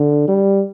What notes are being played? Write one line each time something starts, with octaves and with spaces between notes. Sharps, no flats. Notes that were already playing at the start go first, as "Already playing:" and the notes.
Already playing: D3
G3